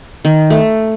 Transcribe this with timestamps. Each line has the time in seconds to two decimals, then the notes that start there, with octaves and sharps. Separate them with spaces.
0.25 D#3
0.50 A3